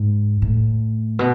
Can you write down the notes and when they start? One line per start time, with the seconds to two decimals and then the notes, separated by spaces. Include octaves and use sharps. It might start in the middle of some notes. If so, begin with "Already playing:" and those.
Already playing: G#2
0.42 A2
1.19 B2